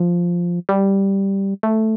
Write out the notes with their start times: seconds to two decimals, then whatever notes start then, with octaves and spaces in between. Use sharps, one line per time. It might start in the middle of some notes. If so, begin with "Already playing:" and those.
Already playing: F3
0.69 G3
1.63 A3